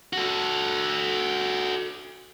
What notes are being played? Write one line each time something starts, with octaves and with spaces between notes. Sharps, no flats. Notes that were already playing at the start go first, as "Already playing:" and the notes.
F#4 A4